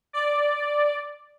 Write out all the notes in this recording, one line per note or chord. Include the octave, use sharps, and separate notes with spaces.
D5